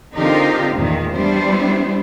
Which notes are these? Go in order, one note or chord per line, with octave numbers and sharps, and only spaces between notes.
D3 C4 D#4 F4 G4 A#4
E2 A#2 D#3
G3 B3 D4 E4 C5